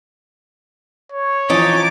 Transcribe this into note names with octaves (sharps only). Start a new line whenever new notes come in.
C#5
E3 F3 C#4 D#4 D6 A6